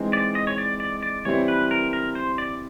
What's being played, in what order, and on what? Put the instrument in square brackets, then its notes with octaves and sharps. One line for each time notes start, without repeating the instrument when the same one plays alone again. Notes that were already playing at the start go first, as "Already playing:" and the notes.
Already playing: [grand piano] E3 G#3 C4 D#4
[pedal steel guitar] D5
D#5
C#5
D5
D5
D5
[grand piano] E3 G3 C4 E4 [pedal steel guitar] C#5
[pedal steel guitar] B4
A#4
A#4
C5
D5